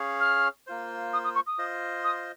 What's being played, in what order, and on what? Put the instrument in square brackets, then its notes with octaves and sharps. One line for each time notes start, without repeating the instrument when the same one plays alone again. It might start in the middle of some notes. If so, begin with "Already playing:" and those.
Already playing: [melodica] C#4 G#4 C#5 F5
[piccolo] F6
[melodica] A#3 F4 C5
[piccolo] D#6
D#6
C#6
D#6
[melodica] F4 C5 D#5
[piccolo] D#6